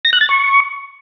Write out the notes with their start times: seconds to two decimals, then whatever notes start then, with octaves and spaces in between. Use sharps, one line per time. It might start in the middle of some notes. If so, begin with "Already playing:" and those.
0.05 A#6
0.13 F#6
0.21 A6
0.29 C#6